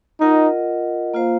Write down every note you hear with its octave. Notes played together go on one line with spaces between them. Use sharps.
D#4 F4 A#4 D#5 F#5
A#3 F4 C5 F5